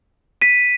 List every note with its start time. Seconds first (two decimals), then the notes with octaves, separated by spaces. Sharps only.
0.42 B6 D#7